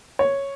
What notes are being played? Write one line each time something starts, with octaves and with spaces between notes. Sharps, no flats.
C#5